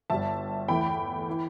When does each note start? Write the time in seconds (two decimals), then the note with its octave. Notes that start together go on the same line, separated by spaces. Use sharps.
0.10 G1 G2 G3 E5 A5
0.68 E2 E3 A3 G5 B5
1.30 E3